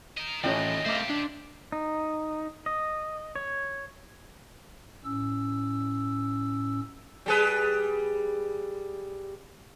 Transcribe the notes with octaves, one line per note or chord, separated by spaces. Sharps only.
A#4 D#5
D#3 E3 A3 C#4 D4 F4 D#5 G5
A3 G4 C5 E5 F5 D6
D4
D#4
D#5
C#5
A2 C#4 E6
G3 G#4 B4